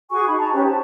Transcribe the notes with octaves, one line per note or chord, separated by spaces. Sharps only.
F#4 G#4 G#5 C#6
D#4 B5
A5 A#5
C#4 G4 B4 C5
A5